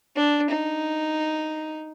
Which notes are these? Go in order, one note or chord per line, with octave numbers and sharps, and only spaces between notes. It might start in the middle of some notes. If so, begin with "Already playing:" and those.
D4
D#4